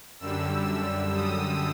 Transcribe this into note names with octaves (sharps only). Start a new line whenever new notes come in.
F#2 D3 G3 E6
E6
D#6